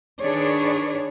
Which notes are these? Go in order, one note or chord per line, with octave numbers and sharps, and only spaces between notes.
D#3 D4 G#4 B4 C#5 D5